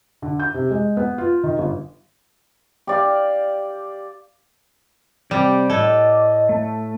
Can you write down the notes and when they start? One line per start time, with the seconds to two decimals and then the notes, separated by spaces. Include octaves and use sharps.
0.22 D3
0.40 G6
0.54 C3
0.71 G#3
0.97 B3
1.18 F4
1.44 D#3
1.59 G1
2.87 G4 D5 F5
5.31 C3 G3 D5 G5
5.70 A2 A4 D#5
6.49 A3